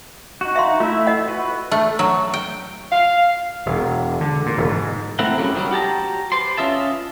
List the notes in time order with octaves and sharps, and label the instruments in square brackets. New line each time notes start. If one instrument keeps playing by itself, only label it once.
[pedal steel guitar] D#4 F#4
[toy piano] E5 F5 C6
[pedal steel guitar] A3 E4 E5 [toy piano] F4
[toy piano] D#5 F#5
[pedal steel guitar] F#4 B4
[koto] A3
F#3
G5
[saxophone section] F5
[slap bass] E1
D3
A#2
E1
G#2
[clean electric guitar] A3 C4 E4 F#5 A#5
F#2 C#3 F3 G3
D#3 F#3 G3
F#4 G4 A5 A#5
B4 C5 D5 C6
C#4 F4 D#5 E5 A5